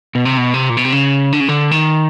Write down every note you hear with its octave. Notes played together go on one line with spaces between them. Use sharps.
B2
C3
B2
C3
A#2
B2
C3
C#3
D3
C#3
D3
D#3